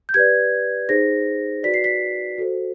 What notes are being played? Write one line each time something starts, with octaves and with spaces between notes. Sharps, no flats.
G6
G4 B4 D5 G#6
D#4 G#4 C5 A#6
F#4 B4 D5 B6
C7
B6
F#4 A4 C5